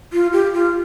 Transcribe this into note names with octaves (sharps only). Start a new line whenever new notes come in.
F4
G4
F4